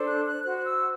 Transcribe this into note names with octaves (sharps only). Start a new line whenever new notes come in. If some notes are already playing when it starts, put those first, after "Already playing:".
Already playing: D4 A4 C5
F#6
F#6
F#4 C5 F#6
F#6
E6